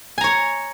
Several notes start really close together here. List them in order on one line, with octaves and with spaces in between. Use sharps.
G#5 A#5 C#5